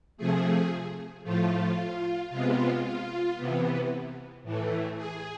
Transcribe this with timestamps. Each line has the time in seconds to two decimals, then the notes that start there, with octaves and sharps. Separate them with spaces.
0.17 C3 F3 A3 G#4
1.24 A2 F3 A3 F4
2.30 C3 G#3 B3 F4
2.83 F4
3.36 C3 E3 B3
4.43 A2 E3 A3
4.96 G#4